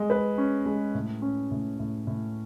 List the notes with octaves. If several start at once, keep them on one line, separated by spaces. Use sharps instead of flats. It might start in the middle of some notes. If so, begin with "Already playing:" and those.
Already playing: G#3
B4
C#4
G#3
A2
C#4
A2
A2
A2